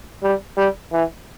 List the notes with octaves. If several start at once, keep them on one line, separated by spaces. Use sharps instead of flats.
G3
G3
E3